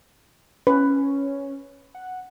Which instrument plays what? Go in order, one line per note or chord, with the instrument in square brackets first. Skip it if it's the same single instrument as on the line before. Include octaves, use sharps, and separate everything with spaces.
[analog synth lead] C#4 [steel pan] B4
[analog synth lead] F#5